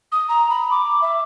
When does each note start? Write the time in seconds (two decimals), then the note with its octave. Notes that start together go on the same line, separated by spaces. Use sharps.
0.11 D#6
0.28 A#5
0.49 B5
0.71 D6
1.01 E5